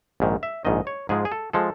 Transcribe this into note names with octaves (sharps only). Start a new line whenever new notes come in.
A#1 G#2 D#3
E5
A#1 G#2 D#3 D#5
C#5
G#2 F3 G#3 G#4
G#4
A4
F3 G#3 A4